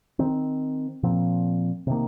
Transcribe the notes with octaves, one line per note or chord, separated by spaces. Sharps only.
D#3 C4
A#2 F3 C4
C3 D#3 A#3